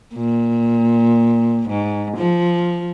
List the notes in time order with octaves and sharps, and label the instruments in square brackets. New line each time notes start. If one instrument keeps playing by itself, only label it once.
[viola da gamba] A#2
G#2
F3